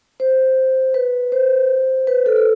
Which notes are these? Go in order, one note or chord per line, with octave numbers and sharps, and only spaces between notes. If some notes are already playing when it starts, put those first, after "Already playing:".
C5
B4
C5
B4
A4
A4